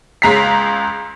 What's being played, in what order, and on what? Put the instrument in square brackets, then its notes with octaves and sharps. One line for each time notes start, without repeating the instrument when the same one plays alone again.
[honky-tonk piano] C#2 G#3 A#5 B6 C7